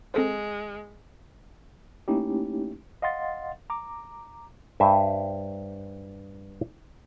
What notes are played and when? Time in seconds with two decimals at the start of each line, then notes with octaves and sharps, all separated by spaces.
0.14 G#3 C4 A4 C5
2.08 A3 A#3 C#4 D#4 E4 G4
3.02 D#5 F5 F#5 C6 A6
3.70 A#5 D6
4.80 G2 G4 C5 E5 G#5